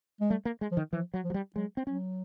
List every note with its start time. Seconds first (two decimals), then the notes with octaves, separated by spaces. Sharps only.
0.20 G#3
0.30 G3 A3
0.45 A#3
0.61 G#3
0.71 F3
0.77 D#3
0.93 E3 F3
1.14 F#3
1.24 F3
1.30 F#3
1.34 G3
1.55 F#3 G#3
1.77 C4
1.87 F#3 C#4